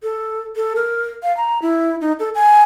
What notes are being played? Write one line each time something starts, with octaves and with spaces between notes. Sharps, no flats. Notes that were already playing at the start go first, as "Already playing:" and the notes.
A4
A4
A#4
F5
A#5
E4
D#4
A4
G#5